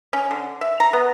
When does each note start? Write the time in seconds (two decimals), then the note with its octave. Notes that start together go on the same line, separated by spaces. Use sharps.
0.13 C#4
0.31 D3
0.61 E5
0.80 A#5
0.93 B3